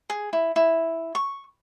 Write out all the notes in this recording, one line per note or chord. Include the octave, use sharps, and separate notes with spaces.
G#4
E4
E4
C#6